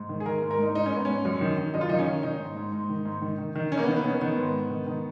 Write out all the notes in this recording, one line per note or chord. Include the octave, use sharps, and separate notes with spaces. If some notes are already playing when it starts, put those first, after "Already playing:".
Already playing: G#2
D#3
G#4
D#3 A#4
A#4
G#2
A#4
G#2 D#4
G#2 D#4
C#4
G#2 B3
G#2 C#4
F#2
D#3
D#3
F#2 D#4
F4
D#3 D#4
C#4
D#3
D#3 D#4
G#2
G#2
G#2
D#3
G#2
D#3
D#3
D#3
D#3 C#4
A#3
B3
D#3
B3
D#3 C#4
D#3 B3
G#2
G#2
D#3
D#3